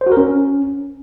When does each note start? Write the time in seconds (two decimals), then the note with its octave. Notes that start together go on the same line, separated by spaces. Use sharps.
0.01 C5
0.06 F#4
0.12 A#4
0.17 C#4